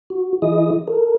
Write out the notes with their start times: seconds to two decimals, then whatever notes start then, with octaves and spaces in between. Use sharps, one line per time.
0.10 F#4
0.42 E3 E4 G#4 D#5 D#6
0.88 A4 A#4